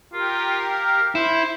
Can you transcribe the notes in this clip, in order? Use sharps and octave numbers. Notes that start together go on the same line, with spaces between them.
F4 G4 A#4
F5
E4 C5